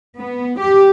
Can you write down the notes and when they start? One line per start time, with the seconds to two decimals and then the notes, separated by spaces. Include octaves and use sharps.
0.18 B3
0.59 G4